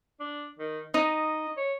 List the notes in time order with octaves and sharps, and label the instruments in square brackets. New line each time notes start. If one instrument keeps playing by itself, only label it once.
[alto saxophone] D4
D#3
[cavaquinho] D#4 [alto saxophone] D#5
[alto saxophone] C#5